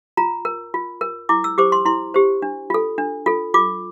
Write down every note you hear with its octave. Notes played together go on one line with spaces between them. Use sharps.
F4 A#5
A#4
F4
A#4
E4 D6
E6
G4 C5 D6
C6
E4 C6
G4 C5
D4
F4 A4
D4
F4 A4
F4 D6